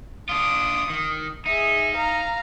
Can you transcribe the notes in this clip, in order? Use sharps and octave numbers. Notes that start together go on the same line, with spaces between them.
D4 F4 D#6
D#3
D#4 G#4 E5
F5 A#5